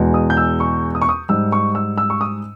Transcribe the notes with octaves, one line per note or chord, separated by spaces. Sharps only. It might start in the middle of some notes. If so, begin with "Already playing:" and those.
Already playing: E2 B2 G#3
D#6
G6
E6
C#6
D#6
C#6
D#6
G#2 G3 E6
C#6
E6
E6
C#6
D#6